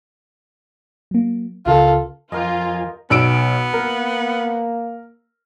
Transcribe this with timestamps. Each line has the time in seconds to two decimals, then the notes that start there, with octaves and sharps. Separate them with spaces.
1.11 F#3 A#3
1.66 C#2 C#3 F4 A4 A#4
2.32 F2 F3 F4 G4 A#4 D#5 G#5
3.10 B1 B3 E6 D7
3.73 A#3 A#4